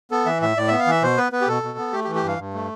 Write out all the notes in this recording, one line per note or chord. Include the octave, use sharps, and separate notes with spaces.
B3 A4
E3 E5
A2 E5
A2 D5
B3 E5
F5
E3 E5
B2 C5
B3 B4
B3 B4
G4
B2 A4
B2
B3
A3 G4
G4
E3
G4
G2 F5
G2
A3